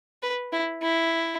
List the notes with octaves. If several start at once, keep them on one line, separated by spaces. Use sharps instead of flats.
B4
E4
E4